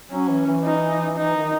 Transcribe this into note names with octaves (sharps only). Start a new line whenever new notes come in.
F#3 C#4
E3
E3
D#4
E3 D#4
D#3